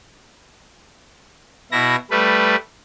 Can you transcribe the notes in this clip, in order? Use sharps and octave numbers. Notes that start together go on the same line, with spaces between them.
B2 E4 A#6
G3 A3 B4